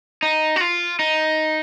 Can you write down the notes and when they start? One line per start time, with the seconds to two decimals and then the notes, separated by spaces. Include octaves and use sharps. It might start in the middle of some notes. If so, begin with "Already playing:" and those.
0.23 D#4
0.56 F#4
0.61 F4
0.99 D#4